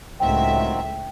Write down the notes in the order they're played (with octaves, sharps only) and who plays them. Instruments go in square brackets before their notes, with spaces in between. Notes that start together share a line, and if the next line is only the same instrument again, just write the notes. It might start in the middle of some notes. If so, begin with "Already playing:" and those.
[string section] C#2 A2 E5 [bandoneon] D#3 F#3 C4 [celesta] G5